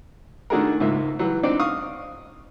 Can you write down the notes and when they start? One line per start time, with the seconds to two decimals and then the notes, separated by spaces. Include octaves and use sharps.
0.50 D#3 A3 D4 F#4 G#4 A#4
0.80 C#2 G#2 A#3 E5
1.19 E3 F#3 G3
1.43 C4 D4 D#4 D5
1.59 F5 C#6 D#6